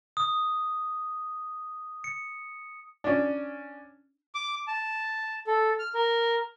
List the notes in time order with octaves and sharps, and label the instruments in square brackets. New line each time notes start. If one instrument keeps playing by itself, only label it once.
[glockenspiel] D#6
C#7
[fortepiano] C#4 D4
[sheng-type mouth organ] D6
A5
A4
F6
A#4